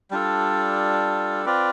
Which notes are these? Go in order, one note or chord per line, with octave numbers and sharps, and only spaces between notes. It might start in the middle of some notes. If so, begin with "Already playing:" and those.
G3 D4 F4 A4
C4 F4 B4 D5